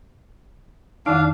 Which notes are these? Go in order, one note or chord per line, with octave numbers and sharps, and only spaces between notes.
F2 D#3 D4 D#4 F5